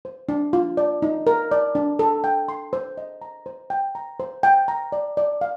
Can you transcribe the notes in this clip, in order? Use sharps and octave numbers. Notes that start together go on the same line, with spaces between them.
C5
D4
F4
D5
D#4
A#4
D5
D4
A4
G5
C6
C5
D#5
A#5
C5
G5
A#5
C5
G5
A#5
D5
D5
F5